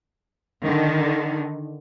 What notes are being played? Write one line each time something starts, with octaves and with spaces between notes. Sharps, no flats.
D3 D#3